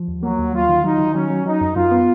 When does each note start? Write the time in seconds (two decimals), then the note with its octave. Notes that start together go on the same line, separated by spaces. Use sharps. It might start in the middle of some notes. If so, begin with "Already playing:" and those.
Already playing: F3
0.08 D#2
0.23 F#3 A#3
0.38 D#2
0.54 F#3 F4
0.69 D#3
0.84 F#3 D#4
0.99 D#3
1.14 F#3 C#4
1.30 F#3
1.46 F#3 D#4
1.61 F#2
1.76 F#2 F4
1.91 B3